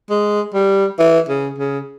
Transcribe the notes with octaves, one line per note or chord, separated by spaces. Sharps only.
G#3
G3
E3
C#3
C#3